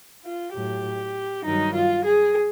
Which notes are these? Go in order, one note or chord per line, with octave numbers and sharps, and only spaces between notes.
F4
A2 F#3 G4
G2 D#3 F#3 D#4
F4
G#4